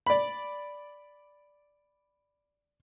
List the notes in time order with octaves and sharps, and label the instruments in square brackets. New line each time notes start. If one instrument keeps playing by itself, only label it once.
[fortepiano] D5 B5